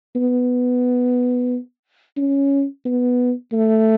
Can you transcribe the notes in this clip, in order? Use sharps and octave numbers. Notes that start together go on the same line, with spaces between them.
B3
C#4
B3
A3